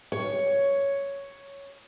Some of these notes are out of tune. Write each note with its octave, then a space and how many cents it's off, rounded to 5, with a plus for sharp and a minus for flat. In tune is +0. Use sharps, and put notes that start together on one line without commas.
C#5 +5